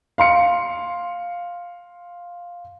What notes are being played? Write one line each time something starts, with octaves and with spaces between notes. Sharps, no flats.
F5 C6 C#7